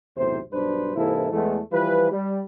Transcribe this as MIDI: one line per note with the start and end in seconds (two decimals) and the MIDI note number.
0.17 0.39 35
0.17 0.39 40
0.17 0.39 45
0.17 0.39 48
0.17 0.39 72
0.52 0.92 35
0.52 0.92 43
0.52 0.92 62
0.52 0.92 71
0.52 0.92 72
0.96 1.31 44
0.96 1.31 48
0.96 1.31 52
0.96 1.31 58
0.96 1.31 64
0.96 1.31 69
1.32 1.58 40
1.32 1.58 52
1.32 1.58 56
1.32 1.58 57
1.72 2.08 52
1.72 2.08 53
1.72 2.08 55
1.72 2.08 65
1.72 2.08 71
2.11 2.40 55